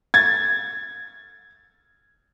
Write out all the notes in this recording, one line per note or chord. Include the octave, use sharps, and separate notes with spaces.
G#6 A6